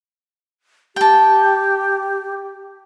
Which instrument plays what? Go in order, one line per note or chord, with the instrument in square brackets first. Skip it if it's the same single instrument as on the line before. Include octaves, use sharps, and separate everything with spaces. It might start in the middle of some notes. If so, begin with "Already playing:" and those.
[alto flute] G4 [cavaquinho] G5 A5